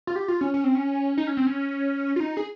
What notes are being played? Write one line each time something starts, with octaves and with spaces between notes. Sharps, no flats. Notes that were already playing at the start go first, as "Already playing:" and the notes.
F4
G4
F4
C#4
C#4
C4
C#4
D#4
C#4
C4
C#4
F4
D#4
G#4